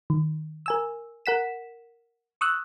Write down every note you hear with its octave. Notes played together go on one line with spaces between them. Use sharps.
D#3
A#4 G#5 E6
A#4 F#5 B6 E7
C#6 D#6 E6 F#6